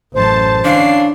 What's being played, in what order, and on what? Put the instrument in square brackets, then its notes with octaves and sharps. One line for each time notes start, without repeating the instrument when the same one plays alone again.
[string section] A1 F#2 A5 [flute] C5
[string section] D3 C#4 C7 [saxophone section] E3 D4 [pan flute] F5